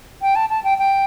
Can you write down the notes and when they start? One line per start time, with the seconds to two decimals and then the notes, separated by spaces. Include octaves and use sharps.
0.22 G5
0.36 A5
0.50 A5
0.64 G5
0.78 G5